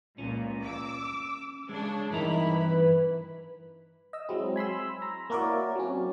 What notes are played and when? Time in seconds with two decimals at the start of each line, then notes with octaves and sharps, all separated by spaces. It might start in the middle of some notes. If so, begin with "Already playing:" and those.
0.18 C#2 A#2 C#4
0.64 D6 E6
1.69 C#3 G#3 D4
2.11 G2 D#3 E3 E4 A#5 B5
2.51 B4
4.13 D#5 E6
4.29 F#3 G#3 C4 E4
4.56 G#5 B5 C6 E6
5.02 A#5
5.30 A#3 E4 F#4 A#4 C#5 D5
5.76 F#3 C4 C#4